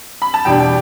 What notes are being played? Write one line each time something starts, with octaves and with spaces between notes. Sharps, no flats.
B5
A5
E2 B2 G3 D4 G5
G5